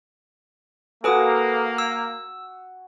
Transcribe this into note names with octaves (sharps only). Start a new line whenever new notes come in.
A#3 F#4 A4 B4 G#5 D#6
E6